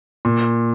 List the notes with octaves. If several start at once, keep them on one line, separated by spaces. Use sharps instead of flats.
A#2